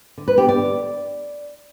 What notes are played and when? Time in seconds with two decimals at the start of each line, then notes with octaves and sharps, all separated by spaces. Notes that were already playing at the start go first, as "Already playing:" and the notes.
0.17 D3
0.28 B4
0.38 B3 D4 G4
0.49 D5
0.59 D3